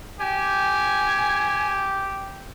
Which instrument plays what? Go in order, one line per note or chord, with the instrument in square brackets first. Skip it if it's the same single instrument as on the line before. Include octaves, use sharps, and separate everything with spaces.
[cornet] G4 [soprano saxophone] G#5